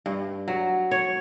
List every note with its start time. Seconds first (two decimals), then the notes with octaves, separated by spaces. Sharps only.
0.06 G2
0.48 F#3
0.91 C#5